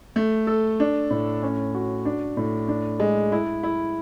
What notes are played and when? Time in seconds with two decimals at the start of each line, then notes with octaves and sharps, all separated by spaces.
0.16 A3
0.47 A4
0.80 D4
1.10 A2
1.43 C#4
1.75 F#4
2.05 D4
2.37 A2
2.68 D4
3.00 G#3
3.32 E4
3.63 E4